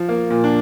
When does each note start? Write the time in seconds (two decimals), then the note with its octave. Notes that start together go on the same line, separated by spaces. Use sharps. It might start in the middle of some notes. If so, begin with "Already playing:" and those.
Already playing: F3
0.09 A#3
0.30 A#2
0.44 D4